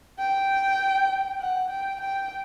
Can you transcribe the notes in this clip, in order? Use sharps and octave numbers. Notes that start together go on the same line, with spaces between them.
G5
F#5
G5
G5